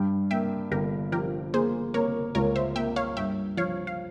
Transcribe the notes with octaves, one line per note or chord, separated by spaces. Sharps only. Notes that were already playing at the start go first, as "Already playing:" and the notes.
Already playing: G2 G5
A#3 E5 G5
G1 G4 A#4
F3 G4 A#4
A#3 G#4 C5
A#3 A#4 C#5
C#2 A#4 C#5
C5 E5
A#3 E5 G5
C#5 F5
G2 E5 G5
F3 C#5 F5
F5